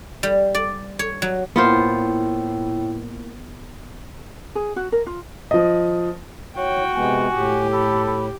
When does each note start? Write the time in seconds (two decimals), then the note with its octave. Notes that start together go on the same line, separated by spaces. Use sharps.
0.23 G3
0.55 D5
0.99 C#5
1.22 F#3
1.56 A2 A#3 B3 E4 F4 A#4 C5
4.55 G#4
4.76 F#4
4.92 A#4
5.07 F4
5.51 F3 D#5
6.57 F#4 C#5 G5
6.95 C3 G#3 B3 G#5
7.33 A2 G4
7.73 A4 B5
8.07 B5